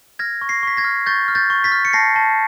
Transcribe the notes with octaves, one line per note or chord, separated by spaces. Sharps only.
F6 G#6 A#6
C#6
A#6 C7
C#6 B6
G#6 A#6
F6
C#6 G6 A6
F6
G6 A6
C#6
A6 B6
F6
C#7
A5 A#6 C7
A5